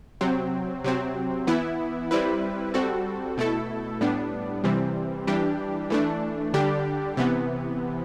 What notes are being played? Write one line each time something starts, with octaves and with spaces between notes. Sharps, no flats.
C3 F#3 C4
C3 F#3 C4
E3 B3 E4
G3 C4 E4 B4
G3 C4 F#4 A4
B2 A3 E4 A4
A2 G3 B3 D4
C3 E3 G3 C4
E3 G3 D4 G4
E3 A3 D4
D3 G3 D4 G4
C3 E3 B3